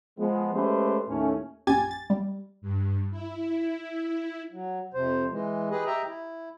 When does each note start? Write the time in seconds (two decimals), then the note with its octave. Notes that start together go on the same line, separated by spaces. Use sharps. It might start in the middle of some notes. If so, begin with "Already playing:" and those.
0.18 F3 G#3 B3
0.54 G#3 A3 C#4 G4 B4 C5
1.08 D#2 A2 A3 C#4
1.67 A#1 F#2 G4 G#5 G#6 A6
1.91 A6
2.10 G3
2.61 G2
3.11 E4
4.52 F#3
4.94 F2 C3 C5
5.31 E3 G#3
5.71 G4 G#4 B4 D#5
5.86 G4 D#5 E5 G5 A#5
6.07 E4